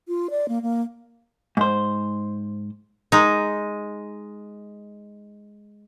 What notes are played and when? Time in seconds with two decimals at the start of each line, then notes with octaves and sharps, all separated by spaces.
0.08 F4
0.30 D5
0.48 A#3
0.62 A#3
1.57 G#2 C5
3.12 G#3 D#4